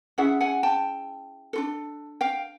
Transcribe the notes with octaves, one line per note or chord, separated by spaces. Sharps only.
C#4 E4 G#4 E5 F#5
F#5 G#5
G5 A5
D4 F4 A4
F5 G5